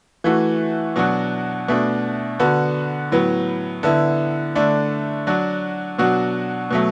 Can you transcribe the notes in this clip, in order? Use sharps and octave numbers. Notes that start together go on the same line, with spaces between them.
E3 A3 F#4
B2 F#3 D4 F#4
B2 A3 D4
D3 B3 F#4
A2 F#3 B3
D3 B3 E4
D3 A3 D4
F#3 D4 F#4
B2 F#3 D4 F#4
B2 F#3 A3